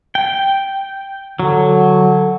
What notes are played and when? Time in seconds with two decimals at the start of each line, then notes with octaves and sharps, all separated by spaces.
0.15 G5
1.40 D3 F#3